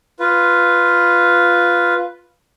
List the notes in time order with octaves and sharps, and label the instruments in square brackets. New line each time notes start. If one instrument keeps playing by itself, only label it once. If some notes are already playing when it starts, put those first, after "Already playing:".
[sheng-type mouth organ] F4 B4